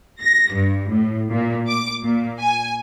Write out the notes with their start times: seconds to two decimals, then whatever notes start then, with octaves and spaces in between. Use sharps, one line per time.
0.22 A#6
0.53 G2
0.91 A2
1.30 A#2
1.67 D6
2.03 A#2
2.39 G#5